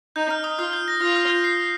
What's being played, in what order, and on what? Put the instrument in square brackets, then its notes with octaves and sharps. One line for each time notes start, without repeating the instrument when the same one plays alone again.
[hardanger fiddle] D#4 [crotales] G6
[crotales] F6
D#6
[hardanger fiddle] F4 [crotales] F6
[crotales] G6
A#6
[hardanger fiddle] F4 [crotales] F6
[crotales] F6
G6
C7